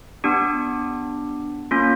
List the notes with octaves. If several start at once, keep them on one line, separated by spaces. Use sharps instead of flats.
B3 D4 G4
A#3 C#4 F4